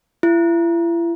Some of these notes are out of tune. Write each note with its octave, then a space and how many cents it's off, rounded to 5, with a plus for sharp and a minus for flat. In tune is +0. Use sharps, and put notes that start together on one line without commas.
E4 +40